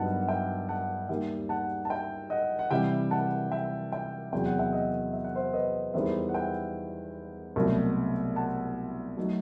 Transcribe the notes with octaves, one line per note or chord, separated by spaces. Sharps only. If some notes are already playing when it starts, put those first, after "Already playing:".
Already playing: G2 F#3 B3 D#4 F#5 A5
F#5
E5 G5
F#5 A5
D#2 D#3 G3 D#4 E5 G5
F#5 A5
A5
E5 G5
D#5 F#5
F#5
C3 E3 G3 E5 G5
F#5 A5
E5 G5
E5 G5
E2 C3 F#3 G5
F#5
E5 G5
D#5 F#5
E5
F#5
C5 E5
B4 D#5
E2 D#3 G3 B3 E4 C5 E5
F#5
E5 G5
C2 B2 F#3 A3
F#5 A5
F#3 A3 D#4